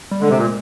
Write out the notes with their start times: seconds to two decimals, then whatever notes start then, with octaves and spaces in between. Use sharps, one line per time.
0.11 G3
0.21 D3 G#3
0.30 C3
0.38 A#2